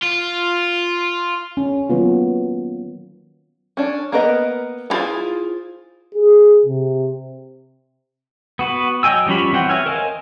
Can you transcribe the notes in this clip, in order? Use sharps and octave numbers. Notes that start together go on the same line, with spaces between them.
F4
C#4
D#3 F#3 A#3 B3 F4
C#4 D4
A#3 B3 A#4 B4 D#5
B3 E4 F4 G#4 C5
G#4
C3
B3 F#4 B4
F#3 D#5 G5 G#5 E6
F3 G3 C#4 F#4 B5
E3 C4 F#5 G5
F#4 C#5 E5 G#5 F6
A#4 C5 D#5 F5 G#5